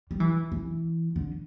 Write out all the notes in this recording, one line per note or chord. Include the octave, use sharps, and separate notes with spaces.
G3
E3
E3
D3